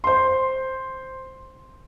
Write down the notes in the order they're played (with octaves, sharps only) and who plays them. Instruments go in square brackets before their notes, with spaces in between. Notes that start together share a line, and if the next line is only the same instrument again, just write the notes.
[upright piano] C5 C6